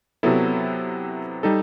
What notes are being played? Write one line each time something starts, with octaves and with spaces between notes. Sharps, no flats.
C3 F#3 B3 E4 A4
G3 D#4 A4